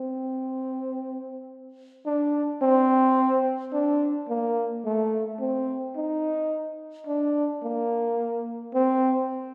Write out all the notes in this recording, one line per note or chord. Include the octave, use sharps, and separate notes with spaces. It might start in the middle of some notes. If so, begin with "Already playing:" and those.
Already playing: C4
D4
C4
D4
A#3
A3
C4
D#4
D4
A#3
C4